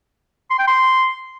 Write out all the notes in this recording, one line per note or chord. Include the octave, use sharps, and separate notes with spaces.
C6
G5
C6